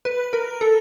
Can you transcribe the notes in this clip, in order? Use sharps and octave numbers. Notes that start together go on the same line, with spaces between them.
B4
A#4
A4